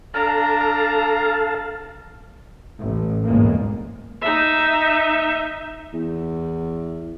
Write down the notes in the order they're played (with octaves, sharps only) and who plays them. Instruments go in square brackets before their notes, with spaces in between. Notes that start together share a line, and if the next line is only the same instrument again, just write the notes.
[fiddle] D4 A#5 [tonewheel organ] A4 F5 A5
[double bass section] A1
B1 E2 G#2 G#3 A#3
[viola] D#4 E5
[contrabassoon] E2